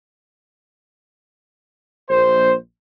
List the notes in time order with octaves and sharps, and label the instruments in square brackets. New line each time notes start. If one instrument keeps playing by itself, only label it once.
[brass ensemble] A#1 C5